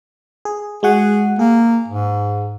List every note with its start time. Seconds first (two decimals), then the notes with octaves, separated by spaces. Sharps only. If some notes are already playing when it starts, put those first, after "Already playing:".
0.45 G#4
0.83 G#3 F#4 G#4 F#5
1.39 A#3 G#4
1.88 G#2